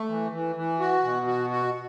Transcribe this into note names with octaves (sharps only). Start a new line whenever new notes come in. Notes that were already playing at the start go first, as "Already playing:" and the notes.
Already playing: A3
E3
E3
E3
F#4
B2
F#4
F#4